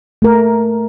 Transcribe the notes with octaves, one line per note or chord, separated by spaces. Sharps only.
A3 A#4